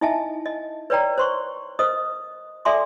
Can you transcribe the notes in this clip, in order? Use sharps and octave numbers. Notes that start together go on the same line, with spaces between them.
D#4 E4 D#5 E5 G#5 A5
D#5
B4 C#5 D5 G5 A#5
C5 C6 C#6
A#4 C5 D#5 D#6
A4 D5 E5 G#5 C6 D6